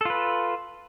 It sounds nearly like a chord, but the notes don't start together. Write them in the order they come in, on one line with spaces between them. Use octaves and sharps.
A4 F4 B4